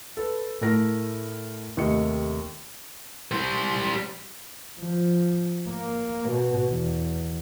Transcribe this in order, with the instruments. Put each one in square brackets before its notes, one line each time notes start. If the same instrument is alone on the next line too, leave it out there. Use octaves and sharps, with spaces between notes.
[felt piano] A4 B4
A2 A3 A#4 A#6
D#2 C3 A3 D#5 C#7
[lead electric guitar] G3 C5
[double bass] F3
A#3
B2
E2